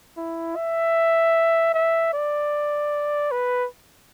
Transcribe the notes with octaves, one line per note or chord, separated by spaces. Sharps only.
E4
E5
E5
D5
B4